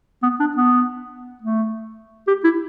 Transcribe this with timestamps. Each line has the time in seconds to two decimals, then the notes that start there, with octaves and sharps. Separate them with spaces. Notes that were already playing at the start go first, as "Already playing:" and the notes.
0.23 B3
0.40 D4
0.57 B3
1.42 A3
2.27 G4
2.44 E4